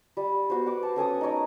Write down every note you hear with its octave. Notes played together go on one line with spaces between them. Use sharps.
G3
B3 F#4 C5
F#5 D6
A5
C#4 A4 G#5 D#6
D#4 A#4 C#5 D#5